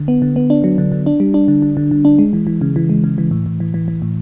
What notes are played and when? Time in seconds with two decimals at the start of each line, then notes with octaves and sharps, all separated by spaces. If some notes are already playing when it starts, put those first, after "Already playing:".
Already playing: D3
0.08 B3
0.22 D3
0.36 B3
0.50 D4
0.64 F#3
0.78 D3
0.92 D3
1.06 D4
1.20 G3
1.34 D4
1.48 D3
1.62 D3
1.77 D3
1.91 D3
2.05 D4
2.19 G#3
2.33 E3
2.47 E3
2.61 C#3
2.76 E3
2.89 G#3
3.04 C#3
3.18 E3
3.31 A2
3.46 A2
3.60 E3
3.74 E3
3.88 E3
4.02 A2